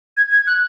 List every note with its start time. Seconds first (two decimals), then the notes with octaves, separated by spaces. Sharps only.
0.17 G#6
0.32 G#6
0.47 F#6